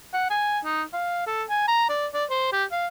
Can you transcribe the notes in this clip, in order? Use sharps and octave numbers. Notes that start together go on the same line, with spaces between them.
F#5
G#5
D#4
F5
A4
G#5
A#5
D5
D5
C5
G4
F5